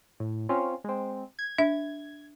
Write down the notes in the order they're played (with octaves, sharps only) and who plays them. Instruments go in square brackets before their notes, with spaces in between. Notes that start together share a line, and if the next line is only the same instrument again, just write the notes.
[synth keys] A2
C4 C#4 F4
G#3 C4
G#6
[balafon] D4 E5